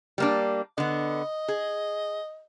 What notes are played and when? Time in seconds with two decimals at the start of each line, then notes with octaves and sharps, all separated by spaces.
0.18 G3 A#3 D4
0.78 D3 B3 D#5
1.48 G#4